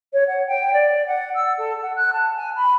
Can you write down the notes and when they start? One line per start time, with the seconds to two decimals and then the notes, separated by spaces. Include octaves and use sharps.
0.13 C#5
0.27 F#5
0.47 G5
0.73 D5
1.07 F#5
1.35 E6
1.58 A4
1.82 F#5
1.96 F#6
2.12 A5
2.36 G#5
2.56 B5